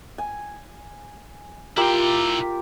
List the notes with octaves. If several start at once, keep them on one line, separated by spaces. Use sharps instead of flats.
G#5
E4 F4 G4 A#4 G5